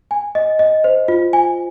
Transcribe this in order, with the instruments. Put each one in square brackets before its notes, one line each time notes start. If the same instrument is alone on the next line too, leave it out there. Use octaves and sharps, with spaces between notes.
[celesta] G#5
D#5
D#5
C5
F4
G#5